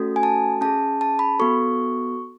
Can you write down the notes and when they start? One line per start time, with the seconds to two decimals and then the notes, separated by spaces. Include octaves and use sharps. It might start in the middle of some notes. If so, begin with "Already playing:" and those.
Already playing: A3 C#4 F#4 A4
0.16 G#5
0.23 A5
0.61 C#4 G#4 A5
1.01 A5
1.19 B5
1.39 B3 F#4 A4 C#6